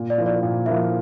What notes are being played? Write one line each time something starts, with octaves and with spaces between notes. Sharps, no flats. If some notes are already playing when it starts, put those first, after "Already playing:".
Already playing: A#2
D5
F3 A#3 E4
D5
A#2
F3 A#3 E4 E5